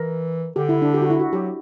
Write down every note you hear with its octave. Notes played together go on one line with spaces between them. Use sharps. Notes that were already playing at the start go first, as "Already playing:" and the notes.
Already playing: E3 A#4
D3 G4
E4
D4
G4
F#4
E4
F#4
F#3 G4